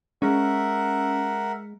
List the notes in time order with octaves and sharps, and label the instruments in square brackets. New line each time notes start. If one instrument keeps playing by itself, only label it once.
[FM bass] G#3 [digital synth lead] C#4 [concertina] A#4 E5 F#5